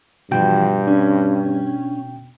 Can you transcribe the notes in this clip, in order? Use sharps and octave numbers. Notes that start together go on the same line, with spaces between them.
G2 B2 E3 F3 F#4 G5
C#4 D4